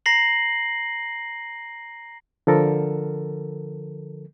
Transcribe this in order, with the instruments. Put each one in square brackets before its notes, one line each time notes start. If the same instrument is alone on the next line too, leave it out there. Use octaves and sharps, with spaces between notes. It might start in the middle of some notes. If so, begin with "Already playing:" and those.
[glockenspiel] A#5 A#6 C7 F#7
[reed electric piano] D3 F3 A4 A#4